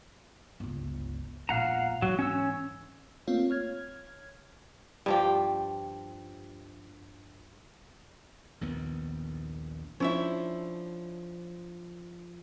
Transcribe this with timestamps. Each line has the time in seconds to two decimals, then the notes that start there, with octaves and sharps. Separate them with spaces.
0.60 G1 C#2
1.49 E1 A#1 F5 F#5 A#5
2.02 G#2 E3 F#3
2.19 C#4 C#5 E6
3.27 A3 A#3 C4 F4 C#5 F5
3.50 C#5 F6 G#6
5.06 G2 F3 G4
8.61 A#1 D#2 D#3 B3
10.00 F3 C#4 D4 E4 E5